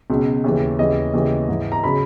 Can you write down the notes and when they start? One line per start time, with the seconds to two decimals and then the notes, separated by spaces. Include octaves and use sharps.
0.10 C#2 B2 F#3
0.44 D#2 C#3 E3
0.79 D#2 C#3 E3 D#5
1.14 D#2 C#3 E3
1.48 G#2 E3
1.72 A#5
1.84 C#3 F#3 B5